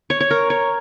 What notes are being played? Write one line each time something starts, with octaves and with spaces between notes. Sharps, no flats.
C#5
C#5
A#4
C#5